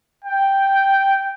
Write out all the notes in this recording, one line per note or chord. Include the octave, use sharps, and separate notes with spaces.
G5